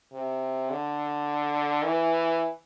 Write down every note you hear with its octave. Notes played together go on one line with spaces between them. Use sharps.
C3
D3
E3